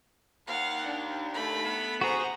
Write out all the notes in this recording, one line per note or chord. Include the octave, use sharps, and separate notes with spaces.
D#2 F5 F#5
D4
A3 B5
B3
F#4 G#4 C5 A#5